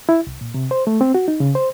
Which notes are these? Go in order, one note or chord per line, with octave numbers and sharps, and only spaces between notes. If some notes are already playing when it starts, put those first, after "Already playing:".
E4
C2
A#2
C3
C5
A3
C4
F#4
D#4
C#3
C5